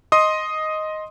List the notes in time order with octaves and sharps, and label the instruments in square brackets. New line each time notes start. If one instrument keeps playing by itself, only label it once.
[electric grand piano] D#5 C6 D#6